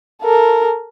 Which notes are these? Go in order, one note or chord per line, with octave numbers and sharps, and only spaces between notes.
A4 A#4